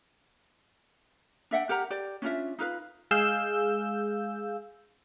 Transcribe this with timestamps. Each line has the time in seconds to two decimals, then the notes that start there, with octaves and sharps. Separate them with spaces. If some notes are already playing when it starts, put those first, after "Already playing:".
1.51 D4 E5 F#5 G5
1.69 G4 A#4 F#5 A#5
1.90 G4 D5
2.22 C#4 D4 F4 E5
2.59 D#4 F4 B4 F5
3.11 G#3 G#4 F5 E6 G6